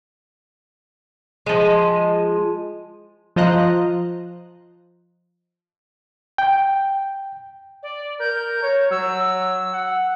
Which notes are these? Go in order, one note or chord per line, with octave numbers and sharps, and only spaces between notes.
F3 G#3
F3 F4 C5 D#5 A#5 F#6
G5
D5
A#4 G6
C#5
F#3 E6
F#5